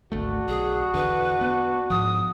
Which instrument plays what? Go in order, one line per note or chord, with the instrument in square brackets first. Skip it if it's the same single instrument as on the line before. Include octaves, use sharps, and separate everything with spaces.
[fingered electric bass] G#1 D2 A3 [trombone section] D4 F#4
[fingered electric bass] B1 [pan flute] G#4
[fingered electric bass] E2 D3 [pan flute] B4
[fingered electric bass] B3
[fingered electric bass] G#2 F3 [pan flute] D#6